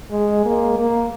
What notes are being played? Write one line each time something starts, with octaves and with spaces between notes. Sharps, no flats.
G#3
A#3
A#3